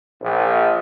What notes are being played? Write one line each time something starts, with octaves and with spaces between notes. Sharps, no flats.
A#1